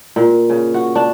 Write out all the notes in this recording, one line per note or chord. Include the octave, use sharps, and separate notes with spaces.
A#2
C#3
F#4
D4